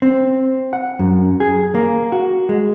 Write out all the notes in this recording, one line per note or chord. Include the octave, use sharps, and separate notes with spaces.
C4
F#5
F#2
G#4
A#3
F#4
G#3